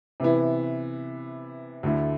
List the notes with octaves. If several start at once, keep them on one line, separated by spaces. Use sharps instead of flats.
C3 E3 B3 E4
D2 D3 A3 E4